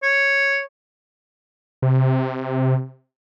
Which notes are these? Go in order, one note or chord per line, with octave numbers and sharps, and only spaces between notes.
C#5
C3